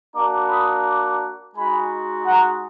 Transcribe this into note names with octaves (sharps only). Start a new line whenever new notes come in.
A#3 D4 F#4 A#5 D6
B5 D#6
A#5 D6
G#3 D#4 F#4 G#5 B5
F#5 A#5